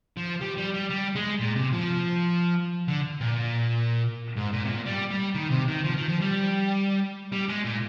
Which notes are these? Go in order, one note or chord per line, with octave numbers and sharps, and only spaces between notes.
F3
G3
G3
G3
G3
G#3
A#2
C3
F3
D3
A#2
G#2
A#2
C3
A#2
G3
G3
D#3
C3
D#3
F3
D#3
F3
G3
G3
G#3
A#2